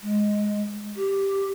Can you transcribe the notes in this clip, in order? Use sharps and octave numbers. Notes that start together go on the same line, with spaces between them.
G#3
G4